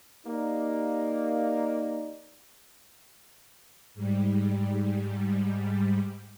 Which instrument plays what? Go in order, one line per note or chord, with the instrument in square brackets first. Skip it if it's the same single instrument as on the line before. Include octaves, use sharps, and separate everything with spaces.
[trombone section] A#3 [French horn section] D#4 G4 D5
[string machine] G#2 G3